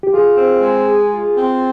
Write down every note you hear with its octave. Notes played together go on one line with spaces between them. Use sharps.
G4
F4 G#4
C4
G#3
G#4
F4
C4